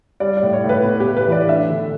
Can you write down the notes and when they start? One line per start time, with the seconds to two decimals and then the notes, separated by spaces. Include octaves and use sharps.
0.20 G3 D5
0.37 D5
0.43 A2
0.53 C#5
0.64 A2
0.69 B4
0.84 B3
1.00 G4
1.06 A2
1.17 B4
1.27 E3
1.32 D5
1.48 D4 E5
1.70 D3